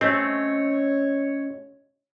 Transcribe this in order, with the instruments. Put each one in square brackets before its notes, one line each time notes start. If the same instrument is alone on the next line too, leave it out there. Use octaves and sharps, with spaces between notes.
[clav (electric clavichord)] A3 C4 [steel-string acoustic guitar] C#4 D#5 [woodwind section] C#5